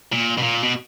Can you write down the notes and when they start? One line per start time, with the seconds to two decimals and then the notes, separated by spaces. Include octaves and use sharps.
0.12 A#2
0.38 B2
0.42 A#2
0.63 B2